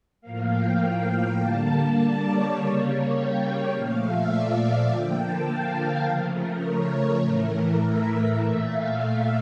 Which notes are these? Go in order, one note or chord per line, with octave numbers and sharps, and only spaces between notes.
A2 F3 A#3 F5
G5
D3 G3 A#3 A5
D5
C#5
C#3 G3 A#3
G5
A#2 F3 A3 F5
E5
D5
E5
D3 F3 A#3 G5
A5
F5
A#4
C#3 F3 A3
A#4
C#5
A#4
A2 E3 A3
E5
A#2 A3 E5
F5